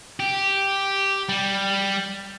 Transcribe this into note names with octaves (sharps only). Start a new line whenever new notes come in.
G4
G3